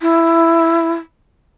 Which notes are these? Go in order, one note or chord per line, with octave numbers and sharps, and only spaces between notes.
E4